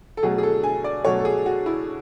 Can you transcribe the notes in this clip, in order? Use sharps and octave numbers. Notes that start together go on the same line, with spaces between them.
A4
B2 F#3 A3 G#4
G#4
A4
G#5
D5
B2 F#3 A3 C#5
A4
G#4
F#4
E4